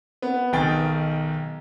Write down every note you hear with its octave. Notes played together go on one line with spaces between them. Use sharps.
B3
B1 D#3 G#4 G5 A6